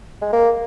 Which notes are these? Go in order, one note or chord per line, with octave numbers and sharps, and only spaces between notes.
G#3
A#3